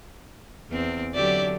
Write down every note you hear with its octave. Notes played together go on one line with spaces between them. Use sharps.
E2 C4
D3 F#3 G4 D5 E5